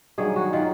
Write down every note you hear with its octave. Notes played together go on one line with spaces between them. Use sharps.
G2 D#3 F#3 G#4
F#4
D#3 F#3 F4